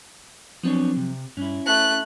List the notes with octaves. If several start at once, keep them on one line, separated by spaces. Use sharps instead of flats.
F3 F#3 B3 C4 D4 C#5
C3
G2 C#4 E4
A3 G#5 B5 F#6